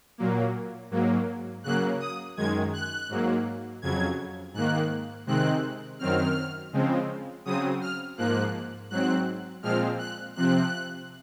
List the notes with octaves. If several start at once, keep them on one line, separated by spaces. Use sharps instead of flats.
A#2 F#3 A#3
G#2 F#3 A#3
C#3 F#3 A#3 F#6
D#6
F#2 D#3 G#3 G#6
F#6
G#2 F#3 A#3
F2 C#3 F#3 G#6
G#2 D#3 A#3 F#6
C3 D#3 G#3 C4 F#6
F#2 D#3 F#3 C4 F6
C#3 F3 G#3 C4
C#3 F#3 C4 D#6
F6
G#2 F3 A#3 F#6
G#2 F#3 C4 F#6
A#2 F3 G#3 C4 F6
F#6
C3 F3 C4 F#6